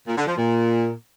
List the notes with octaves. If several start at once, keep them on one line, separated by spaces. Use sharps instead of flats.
A#2
D3
F3
A#2